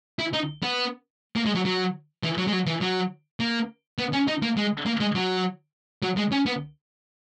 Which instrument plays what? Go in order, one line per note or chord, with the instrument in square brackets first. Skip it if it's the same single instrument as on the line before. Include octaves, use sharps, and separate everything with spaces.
[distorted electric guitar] E4
D#4
B3
A#3
G#3
F#3
F#3
E3
F#3
G#3
F#3
E3
F#3
A#3
B3
C#4
D#4
A#3
G#3
A#3
G#3
F#3
F#3
G#3
C#4
B3